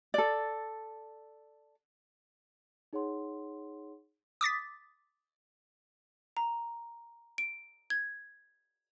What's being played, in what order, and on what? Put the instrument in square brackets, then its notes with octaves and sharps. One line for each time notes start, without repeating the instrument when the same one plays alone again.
[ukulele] A4 D5
[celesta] D#4 G#4 C#5 F#5 C6
[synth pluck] D6 D#6 A6 B6
[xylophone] A#5
D7
G#6